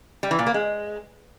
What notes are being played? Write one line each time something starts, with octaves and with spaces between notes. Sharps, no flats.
G3
E3
A#2
A#3
G#3